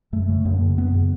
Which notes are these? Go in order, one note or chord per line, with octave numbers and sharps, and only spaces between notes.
F#2 A3
C#3
F#2 A#3
C#3
F#2 B3
C#3